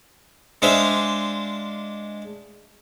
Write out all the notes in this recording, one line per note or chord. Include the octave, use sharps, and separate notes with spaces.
G#3 D4 C5 E5 F5